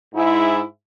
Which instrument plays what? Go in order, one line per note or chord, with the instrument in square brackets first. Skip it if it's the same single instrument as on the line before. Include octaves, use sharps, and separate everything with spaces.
[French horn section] G#2 E4